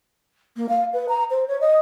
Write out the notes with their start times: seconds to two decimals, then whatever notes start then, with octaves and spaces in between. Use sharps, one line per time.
0.56 A#3
0.69 F5
0.93 B4
1.09 A#5
1.30 C5
1.48 C#5
1.61 D#5